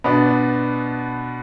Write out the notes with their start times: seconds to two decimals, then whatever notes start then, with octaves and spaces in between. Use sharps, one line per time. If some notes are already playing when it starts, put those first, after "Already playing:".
0.04 B2 B3 D4